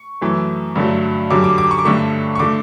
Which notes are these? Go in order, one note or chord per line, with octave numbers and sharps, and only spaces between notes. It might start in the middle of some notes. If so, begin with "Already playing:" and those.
Already playing: C#6
F#2 E3 A3
G2 D3 F#3 A3
F#2 D3 G3 D6
D6
D6
C#6
D6
G2 D3 A3 C#6
C#6
D3 A3 D6